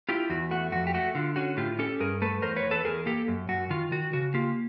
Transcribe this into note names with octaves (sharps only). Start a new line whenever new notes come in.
E4 F4 G4
E2 F#4
A3 F#4
F2 F#4
G4
A3 F#4
D3 F4
C#4 F#4
A2 F4 G4
C#4 G4 A4
G2 G#4 A#4
A3 A4 B4
E2 A#4 C5
B4 C#5
E2
A4 B4
E2 G#4 A#4
A#3 G4 A4
F#2
F#2 F#4
D#3 F4
D#3 F#4
C#3 F#4
A#3 F4 G4